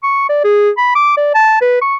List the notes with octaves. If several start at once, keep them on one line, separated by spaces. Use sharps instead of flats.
C#6
D5
G#4
B5
D6
D5
A5
B4
C#6